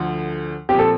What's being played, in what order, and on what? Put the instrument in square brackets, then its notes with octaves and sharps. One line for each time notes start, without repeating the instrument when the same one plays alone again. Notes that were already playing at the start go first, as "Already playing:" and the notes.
Already playing: [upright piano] D2 D3 F3
[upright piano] A#2 F3 C4 [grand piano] G4
[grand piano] A4